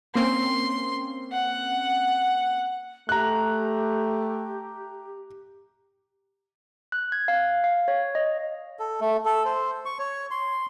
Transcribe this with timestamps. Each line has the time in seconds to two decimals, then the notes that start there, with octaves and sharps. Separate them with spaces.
0.15 A#3 C4 C#4 C6
1.32 F#5
3.09 A3 G4 A#5 F#6
6.92 F#6
7.12 G#6
7.28 F5
7.64 F5
7.88 C#5
8.15 D#5
8.79 A4
9.01 A3
9.25 A4
9.45 C5
9.85 C#6
9.99 C#5
10.31 C6